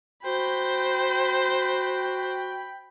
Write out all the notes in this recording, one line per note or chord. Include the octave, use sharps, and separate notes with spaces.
F#4 C5 G5 B5